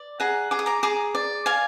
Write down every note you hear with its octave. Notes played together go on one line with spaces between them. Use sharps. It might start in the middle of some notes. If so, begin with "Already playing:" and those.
Already playing: D5
G#4 F#5 A#5
G#4 D6
D#6
A#5 D6
G#4 A#5 D6
D5
D5 F5 G#5